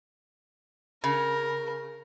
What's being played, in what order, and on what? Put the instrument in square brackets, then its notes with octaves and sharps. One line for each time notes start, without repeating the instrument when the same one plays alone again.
[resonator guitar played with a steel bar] C#3 [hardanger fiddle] A#4